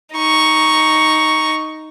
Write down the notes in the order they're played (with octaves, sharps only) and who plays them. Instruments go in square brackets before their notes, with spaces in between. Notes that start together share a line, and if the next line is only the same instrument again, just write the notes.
[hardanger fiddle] D#4 C#6